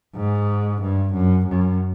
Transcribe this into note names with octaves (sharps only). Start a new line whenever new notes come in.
G#2
G2
F#2
F#2